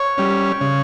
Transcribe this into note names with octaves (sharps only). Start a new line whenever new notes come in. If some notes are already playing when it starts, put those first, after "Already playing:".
Already playing: C#5
G3 C#4
C#3